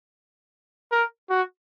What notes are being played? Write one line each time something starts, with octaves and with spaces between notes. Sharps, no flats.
A#4
F#4